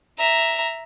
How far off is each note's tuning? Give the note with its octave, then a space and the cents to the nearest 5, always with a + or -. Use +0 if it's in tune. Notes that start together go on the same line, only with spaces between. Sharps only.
E5 +0 A#5 +0